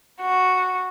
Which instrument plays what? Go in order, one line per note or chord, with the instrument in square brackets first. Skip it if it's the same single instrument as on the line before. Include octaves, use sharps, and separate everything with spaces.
[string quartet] F#4